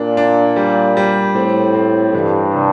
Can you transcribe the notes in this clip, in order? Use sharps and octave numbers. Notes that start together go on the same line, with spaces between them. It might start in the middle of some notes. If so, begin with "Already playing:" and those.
Already playing: A#2 D4
D4
G3
G3
A2 C4
C4
G2 E3
C3